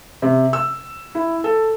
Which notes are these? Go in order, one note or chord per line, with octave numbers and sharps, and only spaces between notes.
C3
E6
E4
A4